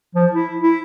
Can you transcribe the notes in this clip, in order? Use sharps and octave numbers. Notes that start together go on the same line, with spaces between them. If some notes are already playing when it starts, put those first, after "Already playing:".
F3
E4
E4